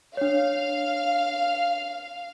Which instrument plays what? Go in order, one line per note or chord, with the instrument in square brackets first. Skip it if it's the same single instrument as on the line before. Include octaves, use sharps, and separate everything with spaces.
[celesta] D4 C#5 [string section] F5